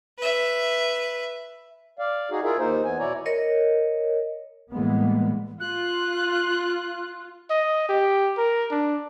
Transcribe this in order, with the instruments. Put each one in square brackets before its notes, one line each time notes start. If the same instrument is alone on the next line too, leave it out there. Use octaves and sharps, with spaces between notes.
[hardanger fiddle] B4 E5
[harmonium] D5 F5
D#4 F#4 G#4
E4 F4 G#4 A#4 E5
D#2 A#3 D#4 A#4 C5
E2 B3 G#5
B2 E4 C#5 D5 A#5
[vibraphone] A#4 C#5 D#5
[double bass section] A2 E3 G3 G#3 A#3 B3
[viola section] F4 [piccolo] F#6
[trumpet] D#5
G4
A#4
D4